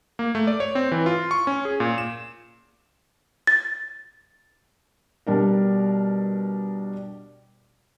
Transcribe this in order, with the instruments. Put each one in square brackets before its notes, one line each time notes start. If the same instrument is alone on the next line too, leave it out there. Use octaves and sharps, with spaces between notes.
[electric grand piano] A#3
A3
D5
C#5
C4
E3
F4
C#6
C#4
G#4
A#2
E7
[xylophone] A6
[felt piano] B2 G3 D4 A#4